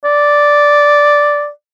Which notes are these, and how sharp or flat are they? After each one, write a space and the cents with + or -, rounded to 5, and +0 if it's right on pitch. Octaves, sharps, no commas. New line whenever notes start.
D5 -5